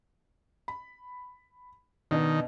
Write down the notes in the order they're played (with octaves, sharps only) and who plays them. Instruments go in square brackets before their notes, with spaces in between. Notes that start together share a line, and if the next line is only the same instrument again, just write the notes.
[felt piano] B5
[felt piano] B2 B3 D4 [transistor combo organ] D#3